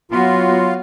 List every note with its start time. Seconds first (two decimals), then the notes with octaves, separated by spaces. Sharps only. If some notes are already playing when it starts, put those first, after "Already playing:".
0.12 F#3 B3 F4 F#4